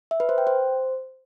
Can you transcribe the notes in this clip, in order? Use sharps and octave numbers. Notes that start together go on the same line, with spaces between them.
E5
B4
C5
G5
C5